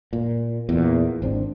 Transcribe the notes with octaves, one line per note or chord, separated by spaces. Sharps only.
A#2
E2 A#2
G#1 C4 D4